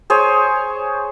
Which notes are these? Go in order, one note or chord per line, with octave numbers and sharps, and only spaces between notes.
G#4 C5 C#5